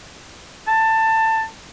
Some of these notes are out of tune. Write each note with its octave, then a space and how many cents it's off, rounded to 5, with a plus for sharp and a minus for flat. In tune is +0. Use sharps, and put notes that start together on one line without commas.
A5 +20